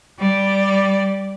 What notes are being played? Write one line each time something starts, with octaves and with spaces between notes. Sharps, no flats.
G3 D5